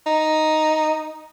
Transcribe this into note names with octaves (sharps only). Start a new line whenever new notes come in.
D#4